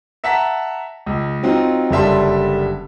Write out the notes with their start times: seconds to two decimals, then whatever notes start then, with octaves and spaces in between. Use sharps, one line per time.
0.24 E5 F#5 A5 A#5 B6
1.06 C#2
1.43 F#3 C4 D#4 F4
1.91 F#1 D3 G3 E5 A5 C6